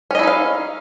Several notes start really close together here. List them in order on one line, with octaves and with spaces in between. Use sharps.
C#4 D#5 E4 D#4 F5